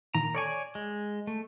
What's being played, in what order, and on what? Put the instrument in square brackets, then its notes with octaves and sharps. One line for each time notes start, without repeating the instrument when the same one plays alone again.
[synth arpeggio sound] A#2 D#3 A#3 [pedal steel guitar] A#5
[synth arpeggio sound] A4 C#6 [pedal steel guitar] C#5 D5 G#5
[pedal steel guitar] G#3
A3